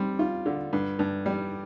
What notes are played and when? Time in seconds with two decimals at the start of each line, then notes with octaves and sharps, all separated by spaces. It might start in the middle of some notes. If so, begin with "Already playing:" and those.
Already playing: G3 C4
0.19 F4
0.46 D3
0.73 G2
0.99 G2
1.26 G3